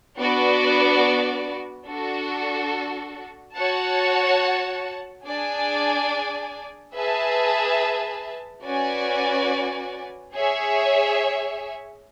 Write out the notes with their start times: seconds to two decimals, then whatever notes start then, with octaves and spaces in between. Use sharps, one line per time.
0.18 B3 D4 F#4 B4 D5
1.88 D4 F#4 A4
3.57 F#4 C#5 F#5 A5
5.26 D4 G#4 D5 G#5
6.94 G#4 B4 E5 A5
8.64 C#4 F#4 B4 D5 G#5
10.34 G#4 C#5 E5